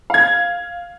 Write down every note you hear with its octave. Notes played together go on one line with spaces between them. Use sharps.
F5 G#6